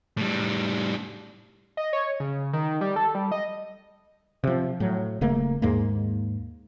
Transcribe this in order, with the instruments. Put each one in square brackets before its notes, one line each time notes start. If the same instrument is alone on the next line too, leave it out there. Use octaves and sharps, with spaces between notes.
[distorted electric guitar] A2 G3
[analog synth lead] D#5
C#5
C#3
D#3
G3
A4
G3
D#5
[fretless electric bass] C3 F3
A2 F#3
D#1 C#3 A3 A#3
D#2 G#2 G#3 A#3